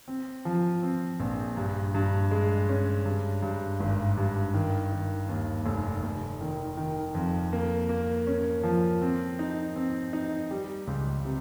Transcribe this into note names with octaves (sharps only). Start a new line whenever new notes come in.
C4
F3
C4
A#1
G2
G2
G#3
C#4
G2
G2
G#1
G2
D#3
D#3
D#2
F1
F1
D#3
D#3
F2
A#3
A#3
C#4
F3
C4
D#4
C4
D#4
G3
C#2
C3